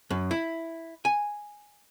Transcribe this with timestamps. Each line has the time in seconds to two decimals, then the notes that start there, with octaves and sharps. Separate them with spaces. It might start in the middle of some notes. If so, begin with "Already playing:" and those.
0.10 F#2
0.31 E4
1.05 G#5